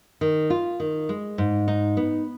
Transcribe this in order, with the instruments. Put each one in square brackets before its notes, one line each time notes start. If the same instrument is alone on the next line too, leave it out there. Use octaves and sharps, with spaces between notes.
[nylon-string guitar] D#3
F4
D#3
G#3
G#2
D#4
B3